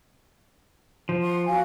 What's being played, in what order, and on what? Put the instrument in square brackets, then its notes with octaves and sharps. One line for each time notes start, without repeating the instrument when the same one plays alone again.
[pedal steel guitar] F3
[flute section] F#5 C6
F#4 F5 G#5